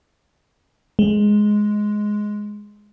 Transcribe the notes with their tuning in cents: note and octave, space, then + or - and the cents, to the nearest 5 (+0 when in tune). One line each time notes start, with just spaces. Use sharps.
G#3 +5